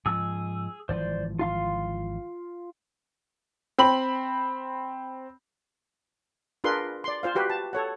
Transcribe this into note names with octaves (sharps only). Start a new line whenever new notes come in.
G#2 F3 G#4 E6
G#1 E3 F3 C5 D5
F4 F5 C6
C4 B5 F#7
D4 F4 G#4 A#4 B4 C6
D5 C6
F4 C5 F5
F#4 G4 B4
A5
A4 C#5 F#5